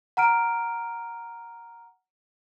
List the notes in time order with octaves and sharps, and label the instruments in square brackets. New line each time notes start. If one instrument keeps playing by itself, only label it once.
[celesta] F#5 A#5 F6 D7